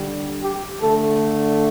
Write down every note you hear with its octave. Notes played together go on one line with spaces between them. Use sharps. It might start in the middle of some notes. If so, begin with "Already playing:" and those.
Already playing: D3 G3
G4
D3 A3 A4